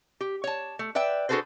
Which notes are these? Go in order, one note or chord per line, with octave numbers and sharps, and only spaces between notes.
G4
C#5 A5
A3
B4 D5 E5 G5
D4 F#4 G#4 A4 B4 C5